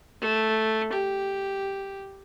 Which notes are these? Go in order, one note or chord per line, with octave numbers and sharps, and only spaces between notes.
A3
G4